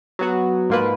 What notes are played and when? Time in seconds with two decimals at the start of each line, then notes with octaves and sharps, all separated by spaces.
0.19 F#3 B3 F#4
0.70 G#2 F3 A#3 F4 B4